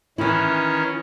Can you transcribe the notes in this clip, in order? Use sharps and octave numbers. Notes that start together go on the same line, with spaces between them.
D#3 E3 C#4 E4